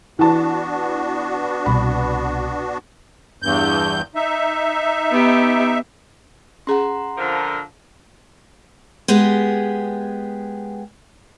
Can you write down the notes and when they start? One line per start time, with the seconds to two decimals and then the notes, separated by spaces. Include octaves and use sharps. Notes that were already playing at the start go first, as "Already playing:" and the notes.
0.19 E3 B3 D4 F#4 A5
1.66 C2 B2 B5
3.42 E2 G2 G6
4.15 D#4 E5
5.11 B3 G4
6.67 C#4 G#4 F#5 A#5 C6
7.18 D3 F3 A#4
9.08 G#3 B3 G4 G#4